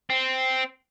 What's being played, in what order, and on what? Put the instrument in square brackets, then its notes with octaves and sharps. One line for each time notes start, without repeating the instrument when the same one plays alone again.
[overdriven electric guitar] C4